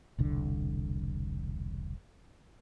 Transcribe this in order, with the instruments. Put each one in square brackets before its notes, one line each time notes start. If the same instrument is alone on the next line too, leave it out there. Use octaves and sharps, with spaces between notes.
[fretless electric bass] E1 C2 D3